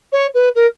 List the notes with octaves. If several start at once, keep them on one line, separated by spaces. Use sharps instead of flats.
C#5
B4
A#4